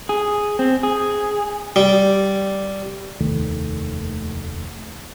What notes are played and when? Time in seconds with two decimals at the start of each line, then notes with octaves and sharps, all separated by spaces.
0.09 G#4
0.59 C4
0.83 G#4
1.76 G3
3.20 F1 D#2 D#3 A3